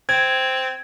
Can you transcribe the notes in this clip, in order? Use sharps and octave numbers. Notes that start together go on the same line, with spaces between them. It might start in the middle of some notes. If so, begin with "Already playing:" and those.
C4 G#6